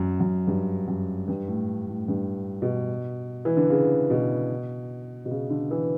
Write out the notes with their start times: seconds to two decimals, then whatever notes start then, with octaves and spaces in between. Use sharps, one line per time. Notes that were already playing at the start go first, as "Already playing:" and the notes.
Already playing: F#2
0.20 F#2
0.47 G2
0.88 F#2
1.28 G2
1.48 A2
1.88 A2
2.08 G2
2.62 B2
3.45 E3
3.57 D3
3.70 C#3
4.10 B2
5.25 B2
5.31 C#3
5.50 D3
5.71 E3